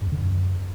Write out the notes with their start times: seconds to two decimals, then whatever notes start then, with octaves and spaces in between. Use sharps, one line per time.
0.02 G2
0.07 E2
0.12 D3
0.17 F2
0.22 F#2